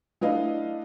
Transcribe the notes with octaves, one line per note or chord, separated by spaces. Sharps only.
A3 D4 E4 B4 D#5 F5